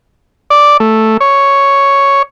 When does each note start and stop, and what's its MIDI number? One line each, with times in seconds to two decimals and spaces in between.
0.50 0.77 74
0.80 1.17 57
1.20 2.22 73